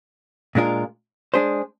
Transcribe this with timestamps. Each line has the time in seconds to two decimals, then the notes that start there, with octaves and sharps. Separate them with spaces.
0.55 A#2 G#3 D4 F4 A#4
1.34 G#3 D4 G#4 C5